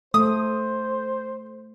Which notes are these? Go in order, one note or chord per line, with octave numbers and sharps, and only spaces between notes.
A3 C5 D#6